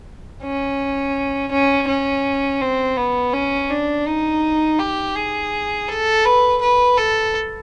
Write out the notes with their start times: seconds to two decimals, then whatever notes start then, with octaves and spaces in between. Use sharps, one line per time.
0.43 C#4
1.52 C#4
1.88 C#4
2.62 C4
2.97 B3
3.33 C#4
3.70 D4
4.07 D#4
4.79 G4
5.15 G#4
5.89 A4
6.25 B4
6.61 B4
6.98 A4